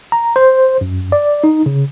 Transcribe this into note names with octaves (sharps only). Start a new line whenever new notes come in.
A#5
C5
F#2
D5
D#4
C#3